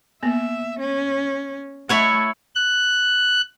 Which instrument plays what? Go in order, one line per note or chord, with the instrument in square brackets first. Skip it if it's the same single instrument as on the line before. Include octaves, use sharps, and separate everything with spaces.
[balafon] A#3 B3 [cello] E5
[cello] C#4
[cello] A3 [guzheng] E4 C#5 F#5
[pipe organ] F#6